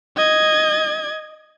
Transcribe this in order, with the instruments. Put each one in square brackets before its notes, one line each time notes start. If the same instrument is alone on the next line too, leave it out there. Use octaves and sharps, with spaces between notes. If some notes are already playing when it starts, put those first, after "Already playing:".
[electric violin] D#5 G#6